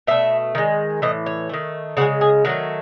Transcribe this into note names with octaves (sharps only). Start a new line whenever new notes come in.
B2 A3 E5
D#3 G#3
A2 E3 D#5
C#5
D#3 A3
C#3 E3 G#3 F#4
G#4
D#3 F#3 A3 F#4